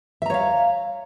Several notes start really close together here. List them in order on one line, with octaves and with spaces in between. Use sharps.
E5 A#5 C#5 F5